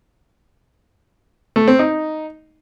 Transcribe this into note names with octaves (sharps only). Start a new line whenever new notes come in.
A3
C4
D#4